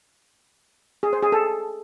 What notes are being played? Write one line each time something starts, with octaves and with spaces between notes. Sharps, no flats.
G#4
C5
G#4
A4